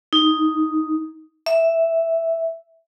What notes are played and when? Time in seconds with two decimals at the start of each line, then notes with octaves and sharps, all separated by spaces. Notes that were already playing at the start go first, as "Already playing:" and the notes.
0.13 D#4
1.46 E5